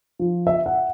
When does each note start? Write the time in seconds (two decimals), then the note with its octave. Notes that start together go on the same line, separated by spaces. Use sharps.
0.19 F3
0.47 E5
0.66 F#5